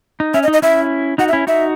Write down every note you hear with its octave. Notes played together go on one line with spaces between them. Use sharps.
D#4
C#4 E5
D#5
D#4
D#5
C#4 E4 E5
D#4 F#4 F#5
E5
C#4 E4
D#4 F#4 E5